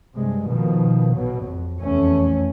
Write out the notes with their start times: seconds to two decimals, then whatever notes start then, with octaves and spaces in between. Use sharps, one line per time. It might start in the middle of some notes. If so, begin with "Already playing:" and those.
0.16 G2 C3 G#3
0.47 B2 D#3 F3
1.14 A1 B2 F#3
1.43 F2
1.82 F1 E2 A3 C#4